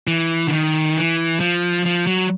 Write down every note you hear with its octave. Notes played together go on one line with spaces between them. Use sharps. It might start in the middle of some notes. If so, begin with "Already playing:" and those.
E3
D3
D#3
E3
F3
F3
F#3